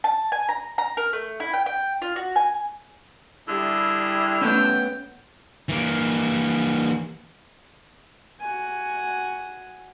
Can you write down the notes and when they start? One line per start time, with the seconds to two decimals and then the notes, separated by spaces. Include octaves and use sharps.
0.04 A5
0.32 G#5
0.49 A#5
0.78 A#5
0.97 A#4
1.13 A3
1.40 E4
1.54 G5
1.66 G5
2.02 F4
2.16 F#4
2.36 G#5
3.48 D3 G3 E4 G#4
4.41 A3 B3 C#4 G5
5.69 E3 A#3
8.40 F#4 G#5